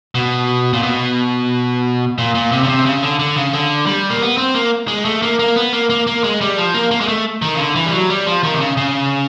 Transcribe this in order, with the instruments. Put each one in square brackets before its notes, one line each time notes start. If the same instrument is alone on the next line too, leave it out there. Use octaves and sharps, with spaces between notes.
[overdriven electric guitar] B2
A#2
B2
A#2
A#2
C3
C#3
C3
C#3
D3
D3
C#3
D3
G3
A#3
B3
C4
A#3
G#3
A3
A#3
A#3
B3
A#3
A#3
A#3
G#3
G3
F3
A#3
A#3
G#3
A3
D#3
C#3
D3
E3
G3
F#3
G3
F3
D#3
C3
C#3
C#3